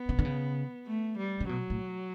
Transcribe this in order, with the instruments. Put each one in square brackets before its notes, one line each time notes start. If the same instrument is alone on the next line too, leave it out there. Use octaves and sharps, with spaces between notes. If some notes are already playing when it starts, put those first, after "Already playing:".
Already playing: [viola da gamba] B3
[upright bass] C#3
D3
C#3
[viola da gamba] A3
G3
[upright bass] C#3
[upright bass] B2 [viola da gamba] F#3
[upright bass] A2